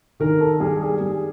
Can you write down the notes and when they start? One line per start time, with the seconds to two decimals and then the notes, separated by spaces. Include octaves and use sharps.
0.20 D#3 A#4
0.40 A4
0.60 G3 G#4
0.81 G#4
1.01 G3